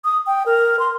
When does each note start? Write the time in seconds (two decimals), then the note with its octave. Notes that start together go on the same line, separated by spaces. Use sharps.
0.05 D#6
0.27 G5
0.46 A#4
0.79 C6